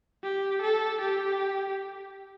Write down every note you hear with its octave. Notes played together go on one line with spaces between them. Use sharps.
G4
A4
G4